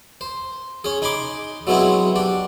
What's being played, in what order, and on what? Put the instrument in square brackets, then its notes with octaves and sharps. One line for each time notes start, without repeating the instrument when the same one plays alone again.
[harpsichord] C5
C#4 G#4
D#4 G#5 B5 C6 D6
F#3 G#3 B3 C4 E4 F#4
D4 G4